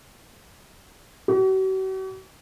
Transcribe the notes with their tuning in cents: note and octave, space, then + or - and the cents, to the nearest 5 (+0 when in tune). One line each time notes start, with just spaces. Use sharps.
F#4 +45